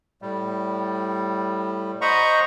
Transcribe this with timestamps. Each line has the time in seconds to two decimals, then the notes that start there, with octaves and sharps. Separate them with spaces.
0.22 A2 G3
2.01 C5 D#5 F#5 A#5 B5 C#6